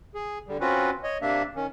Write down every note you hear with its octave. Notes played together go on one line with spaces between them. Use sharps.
G#4
D3 G3
C4 C#4 F4 F#4 B4
C#5 D#5
C3 A#3 D4 E5
D#3 C#4